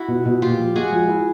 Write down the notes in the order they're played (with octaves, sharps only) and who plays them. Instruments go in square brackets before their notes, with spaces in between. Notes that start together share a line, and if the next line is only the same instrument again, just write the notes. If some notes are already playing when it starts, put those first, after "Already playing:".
Already playing: [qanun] E4 F#4
[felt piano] B2
B2
[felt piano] A#2 [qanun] F4 G4
[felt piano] F3
[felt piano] G#3 [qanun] F#4 G#4
[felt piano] F3
E4